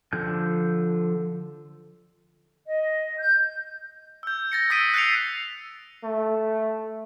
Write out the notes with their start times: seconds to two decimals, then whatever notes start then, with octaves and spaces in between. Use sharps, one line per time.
0.13 D3 F3 G6
2.67 D#5
3.19 G6
4.23 E6 G6
4.52 A6 A#6 C#7
4.70 D#6 E6 A#6 B6 D7 D#7
4.94 F#6 A6 C7 C#7 F7
6.04 A3